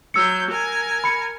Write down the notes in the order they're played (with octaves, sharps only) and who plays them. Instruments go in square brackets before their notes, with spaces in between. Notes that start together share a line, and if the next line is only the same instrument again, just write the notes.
[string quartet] F#3 G6 [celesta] E6 C#7
[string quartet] A#4 G#5
[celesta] B5 C#7